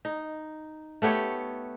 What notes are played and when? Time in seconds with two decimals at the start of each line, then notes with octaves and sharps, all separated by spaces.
0.05 D#4
1.02 A3 B3 G4 C#5